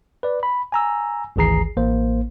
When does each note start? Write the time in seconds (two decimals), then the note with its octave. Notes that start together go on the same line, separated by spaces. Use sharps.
0.23 B4 D5
0.43 B5
0.72 G#5 A#5 E6
1.36 G#1 D2 E3 G#4 A#5 C7
1.77 A1 A#3 C5